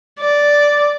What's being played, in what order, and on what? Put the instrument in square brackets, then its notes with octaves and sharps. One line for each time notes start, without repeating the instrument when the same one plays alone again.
[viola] D5